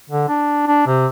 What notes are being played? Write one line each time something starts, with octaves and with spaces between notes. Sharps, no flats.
D3
D4
D4
C3